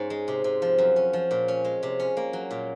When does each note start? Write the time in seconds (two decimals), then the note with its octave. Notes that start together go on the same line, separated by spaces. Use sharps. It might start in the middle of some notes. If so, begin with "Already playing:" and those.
Already playing: G#2 C#4
0.10 G#3
0.28 C3
0.44 C3
0.62 F3
0.78 F#2
0.96 C#4
1.13 F3
1.31 A#2
1.48 C#4
1.64 G#3
1.83 C3
2.00 C#4
2.17 A#3
2.33 F#3
2.51 A#2